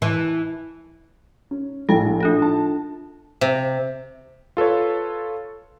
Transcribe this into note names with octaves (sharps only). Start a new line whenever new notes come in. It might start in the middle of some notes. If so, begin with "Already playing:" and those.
E3
C#4
A#1 A2 A4 G5
D4 F4 A4
A5
C3
F4 A4 B4 C#5